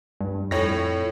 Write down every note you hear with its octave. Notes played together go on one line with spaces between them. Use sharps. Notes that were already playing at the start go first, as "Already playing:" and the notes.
G2
F2 A2 C#5 A#6